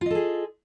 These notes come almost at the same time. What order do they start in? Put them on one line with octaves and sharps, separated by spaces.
F4 D#5 A4 G#4